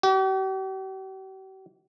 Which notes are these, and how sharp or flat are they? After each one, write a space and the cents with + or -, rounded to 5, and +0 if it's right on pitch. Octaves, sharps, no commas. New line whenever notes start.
G4 -45